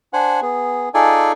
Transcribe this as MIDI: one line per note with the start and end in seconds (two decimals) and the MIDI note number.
0.13 0.40 62
0.13 0.40 72
0.13 0.40 78
0.13 0.40 80
0.42 0.89 59
0.42 0.89 68
0.94 1.32 63
0.94 1.32 65
0.94 1.32 68
0.94 1.32 69
0.94 1.32 74
0.94 1.32 80